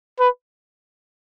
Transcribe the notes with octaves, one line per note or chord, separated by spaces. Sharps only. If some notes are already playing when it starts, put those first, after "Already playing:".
B4